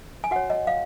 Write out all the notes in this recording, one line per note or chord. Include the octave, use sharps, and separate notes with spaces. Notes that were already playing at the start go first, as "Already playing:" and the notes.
G#5
F#4 C#5 F#5
D#5
F5